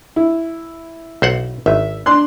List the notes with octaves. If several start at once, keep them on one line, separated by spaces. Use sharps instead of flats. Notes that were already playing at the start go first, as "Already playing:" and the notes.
E4
B1 C5 F#5
G#1 E5
D4 C6 F#6